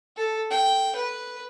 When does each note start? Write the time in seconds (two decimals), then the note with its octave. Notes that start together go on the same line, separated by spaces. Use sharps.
0.17 A4
0.50 G5
0.95 B4